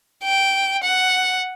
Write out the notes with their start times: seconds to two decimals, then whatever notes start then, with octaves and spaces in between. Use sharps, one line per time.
0.23 G5
0.83 F#5